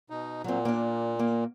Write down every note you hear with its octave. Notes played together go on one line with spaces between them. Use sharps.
B2 D#4
A#2 F#3 C4
A#3 D4
A#3